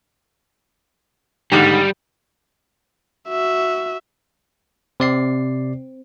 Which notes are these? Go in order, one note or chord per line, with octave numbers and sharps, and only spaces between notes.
G#2 D3 D#3 G3
F#4 E5
C3 C4 D5 C7